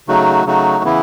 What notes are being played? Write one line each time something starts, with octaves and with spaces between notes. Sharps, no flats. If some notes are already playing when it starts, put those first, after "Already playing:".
C#3 F#3 A3 D#4 F#4
C#3 F#3 A3 D#4 F#4
C#3 E3 B3 E4